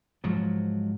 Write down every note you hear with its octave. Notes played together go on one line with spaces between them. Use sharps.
G#2 F3 F#3